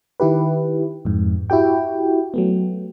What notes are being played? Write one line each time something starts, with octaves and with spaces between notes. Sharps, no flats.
D#3 E4 G4 B4
F2 G#2
E4 F#4 G4 G5
F#3 A3 B3